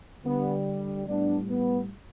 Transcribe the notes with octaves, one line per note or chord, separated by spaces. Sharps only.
D3 G3 B3
A2 G3 B3 D4
B3